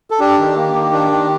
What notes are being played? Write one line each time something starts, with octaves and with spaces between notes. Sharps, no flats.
A4
D4 G4
D#3
A#3
D#3
D4
D#3